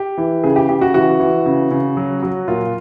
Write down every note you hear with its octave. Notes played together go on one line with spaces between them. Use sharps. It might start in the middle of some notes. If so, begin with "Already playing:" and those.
Already playing: G4
E3
C#3 G#4
G4
C#3 G4
F#4
E3 F#4
E3
C#3
C#3
F#3
F#3
A#2 F4